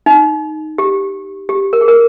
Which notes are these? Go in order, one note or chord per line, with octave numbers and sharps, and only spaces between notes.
D#4
G4
G4
A#4
G#4
A#4